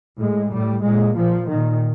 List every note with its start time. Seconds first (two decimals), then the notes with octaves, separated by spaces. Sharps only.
0.21 A2 G#3
0.53 A2 G3
0.84 A#2 G#3
1.16 A#2 F3
1.48 A#2 D#3